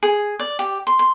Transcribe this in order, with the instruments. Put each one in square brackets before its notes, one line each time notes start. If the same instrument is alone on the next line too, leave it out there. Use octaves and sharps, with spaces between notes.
[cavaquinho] G#4
D5
G4
C6
C6